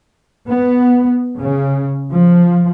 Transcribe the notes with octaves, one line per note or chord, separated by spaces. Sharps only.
B3
C#3
F3